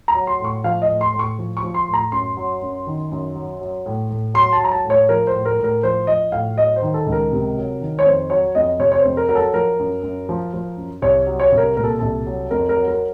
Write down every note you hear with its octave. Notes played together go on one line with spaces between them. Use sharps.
A#5
F#3
C6
A2 C#6
F3 F5
D#5
A2
C6
A2
C#6
F3
C#6
F3
C6
A2
A#5
F#2 C6
F#3
F#2
D#3
F#2
F#3
F#3
A2
A2
F#3 C6
A5
F#3 A#5
A5
A2
C#5
F3 A#4
C5
A2
A#4
A2
A#4
F3 C5
F3 D#5
A2 F5
F#3 D#5
C5
D#3
A4
C#2
A#4
C3
F#3
D#3
C#5
F2 C5
F#3 C#5
F2 D#5
C3 C#5
C#5
C5
F2
A#4
F#3 A#4
A4
F3 A#4
F#2
F#2
F3
F3
F#2
C2 C#5
F#3
C#5
C2
A#4
A#2 A#4
A4
C2 A4
F#3
F2 A#4
A#4
F#3
A#4